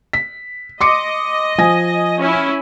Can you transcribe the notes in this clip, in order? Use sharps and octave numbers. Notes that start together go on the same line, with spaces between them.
B6
D#5 C6 D6 C#7
F3 G#5 A#6
C#4 E4